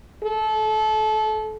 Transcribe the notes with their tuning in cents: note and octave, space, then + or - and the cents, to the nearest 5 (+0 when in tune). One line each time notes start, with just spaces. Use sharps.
A4 -30